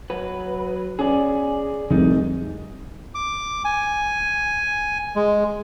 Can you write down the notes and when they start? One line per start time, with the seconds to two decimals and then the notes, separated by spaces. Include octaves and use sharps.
0.10 F#3 B4
0.99 C#4 G#4 D5
1.91 F1 C2 G#3 D#4
3.15 D6
3.65 G#5
5.16 G#3